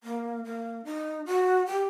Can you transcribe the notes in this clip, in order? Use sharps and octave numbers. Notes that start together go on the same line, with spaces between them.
A#3
A#3
D#4
F#4
G4